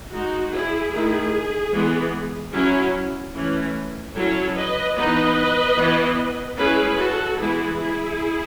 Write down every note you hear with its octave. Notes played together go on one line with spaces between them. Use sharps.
G#3 D#4 F#4
E4 G#4
D#3 A3 E4
E3 G#3 B3
F#3 C#4 E4
E3 A3 C#4
F#3 C#4 E4 A4 C#5
B4 D#5
E3 B3 D#4 B4 D#5
E3 B3 E4
G#3 C#4 E4 G#4 B4
F#4 A4
E3 G#3 B3 E4 G#4
E4 G#4